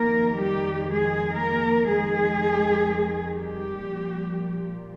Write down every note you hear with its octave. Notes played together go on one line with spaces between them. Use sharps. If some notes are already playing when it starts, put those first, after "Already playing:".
Already playing: F2 D#3 A#3 A#4
G3 G4
G#3 G#4
A#3 A#4
F2 D#3 G#3 G#4
G3 G4
A#2 F3